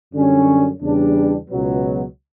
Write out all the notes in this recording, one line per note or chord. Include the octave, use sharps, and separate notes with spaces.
F#2 D3 G3 C#4
E2 C#3 G3 D4
C#2 B2 F#3 B3